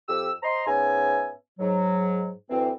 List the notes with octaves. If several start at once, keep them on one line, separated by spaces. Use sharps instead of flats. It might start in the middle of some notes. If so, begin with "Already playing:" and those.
F2 G4 E6
C5 D#5 A#5 C6
G#2 B3 C#4 D#4 E5 G#5
G#2 F#3
D2 E3 C4